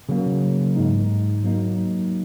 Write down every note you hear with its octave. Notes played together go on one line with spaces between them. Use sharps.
C#3 F#3 A#3
G#2 G#3 D#4
F#3 A#3 D#4